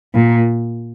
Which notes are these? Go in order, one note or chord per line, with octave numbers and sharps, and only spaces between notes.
A#2